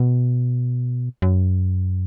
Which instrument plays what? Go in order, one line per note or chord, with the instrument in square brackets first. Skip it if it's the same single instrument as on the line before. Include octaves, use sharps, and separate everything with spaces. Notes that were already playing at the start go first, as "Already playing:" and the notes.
Already playing: [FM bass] B2
F#2